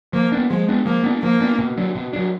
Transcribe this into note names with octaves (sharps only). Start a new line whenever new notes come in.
F3 A#3
B3 D4
F3 G#3
B3 D4
F3 A#3
B3 D4
F3 A#3
B3 D4
B2
F#3 D4
B2
F#3 D4